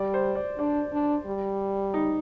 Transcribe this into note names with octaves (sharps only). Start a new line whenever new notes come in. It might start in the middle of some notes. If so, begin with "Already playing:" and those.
Already playing: G3 D5
C5
D5
D4 D5
D4
G3
D#4